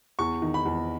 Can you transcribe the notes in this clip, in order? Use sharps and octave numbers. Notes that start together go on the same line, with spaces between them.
E2 C#6
D#3
B5
E2